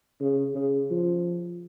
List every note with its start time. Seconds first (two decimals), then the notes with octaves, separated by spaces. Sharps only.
0.20 C#3
0.55 C#3
0.91 F3